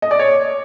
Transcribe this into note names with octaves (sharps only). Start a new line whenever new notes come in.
D#5
D5
C#5